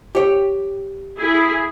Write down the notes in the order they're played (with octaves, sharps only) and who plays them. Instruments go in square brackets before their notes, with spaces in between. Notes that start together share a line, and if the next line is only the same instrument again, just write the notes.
[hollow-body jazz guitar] G4 C#5
[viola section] E4 G#4